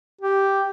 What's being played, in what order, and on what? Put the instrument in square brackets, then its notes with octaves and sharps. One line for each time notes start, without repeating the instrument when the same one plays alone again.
[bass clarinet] G4